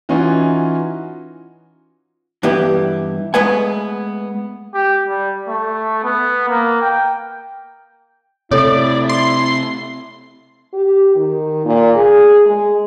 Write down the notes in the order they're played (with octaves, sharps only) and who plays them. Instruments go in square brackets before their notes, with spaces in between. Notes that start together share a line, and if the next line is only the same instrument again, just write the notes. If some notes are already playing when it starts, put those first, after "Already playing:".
[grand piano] E3 C#4 D#4 F4 F#4
[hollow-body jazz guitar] G2 E3 B3 E4 G4
G#3 A3 B3 B4 F#5 G#5
[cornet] G4
G3
A3
B3
A#3
G5
[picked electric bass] C3 A3 [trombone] E4 [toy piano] A4 C#5 [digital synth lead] D5
[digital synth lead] C6
[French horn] G4
D#3
A#2
G#4
G#3